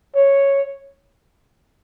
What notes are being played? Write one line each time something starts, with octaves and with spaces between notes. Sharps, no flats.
C#5